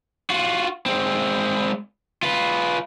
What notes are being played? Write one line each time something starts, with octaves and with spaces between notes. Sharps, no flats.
F4 F#4
G#3 C4
F4 B4